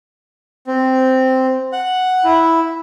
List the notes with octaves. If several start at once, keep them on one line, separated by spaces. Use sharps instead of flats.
C4
F#5
E4